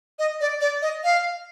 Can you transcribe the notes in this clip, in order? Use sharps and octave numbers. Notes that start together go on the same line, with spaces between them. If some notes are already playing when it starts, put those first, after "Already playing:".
D#5
D5
D5
D#5
F5